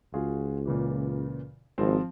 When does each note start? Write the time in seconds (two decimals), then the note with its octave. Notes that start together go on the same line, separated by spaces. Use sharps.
0.14 C#2 F4 F#4 G#4
0.65 A#2 C#3 E3
1.78 G#1 F3 C4